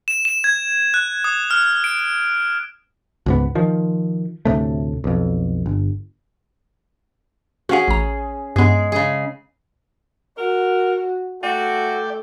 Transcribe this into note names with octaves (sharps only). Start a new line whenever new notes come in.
E7
E7
G#6
F#6
D#6
F6
D7
C#2 G#2 B3
D#3 F3
D2 A2 C3 A3
B1 F2
G1
C#4 F#4 G#4 F5 F#5
A1 A#5
G2 G#3 B3 G#4
C#3 G#4
F#4 A#4
A3 F#4 D5 G5